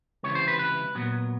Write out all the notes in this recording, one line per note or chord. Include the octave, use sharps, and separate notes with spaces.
C#2 C3 E3 C#5
C5
B4
B4
A#2 F#3 B3